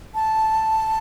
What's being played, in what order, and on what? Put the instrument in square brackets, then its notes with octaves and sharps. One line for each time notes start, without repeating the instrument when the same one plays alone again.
[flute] A5